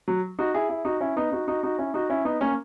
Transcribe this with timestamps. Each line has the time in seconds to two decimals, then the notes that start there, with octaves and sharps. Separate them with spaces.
0.08 F#3
0.39 D#4 F#4
0.54 E4 G#4
0.69 E4 G#4
0.85 D#4 F#4
1.01 C#4 E4
1.16 B3 D#4
1.32 D#4 F#4
1.47 D#4 F#4
1.63 D#4 F#4
1.78 C#4 E4
1.94 D#4 F#4
2.10 C#4 E4
2.25 B3 D#4
2.41 A#3 C#4